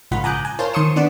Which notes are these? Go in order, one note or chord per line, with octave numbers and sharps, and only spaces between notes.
A#1 G#2 C#3 F4 F#5 B5
G#5 A#5 D6 D#6 F#6 G6
G#5
F4 A#4 C5 C#5 A5 C6
D#3 C6 C#6 D#6 C#7 E7
B3 D4 D5 F#5